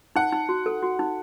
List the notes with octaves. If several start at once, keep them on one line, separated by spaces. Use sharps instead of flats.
D#4 F#5
D#4
F#4
A4
F#4
D#4